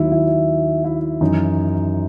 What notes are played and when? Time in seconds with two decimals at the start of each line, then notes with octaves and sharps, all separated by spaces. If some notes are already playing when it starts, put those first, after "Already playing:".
Already playing: D#2 D#3 F#3 E4
0.12 E4
0.85 E4
1.21 F#2 E3 D#4